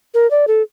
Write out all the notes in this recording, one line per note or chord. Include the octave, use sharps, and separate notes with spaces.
A#4
D5
A4